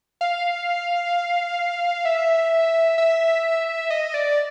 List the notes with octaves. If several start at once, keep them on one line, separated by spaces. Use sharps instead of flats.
F5
E5
E5
D#5
D5